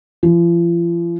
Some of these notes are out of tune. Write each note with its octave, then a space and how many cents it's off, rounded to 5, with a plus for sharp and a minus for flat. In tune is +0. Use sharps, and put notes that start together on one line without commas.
F3 -40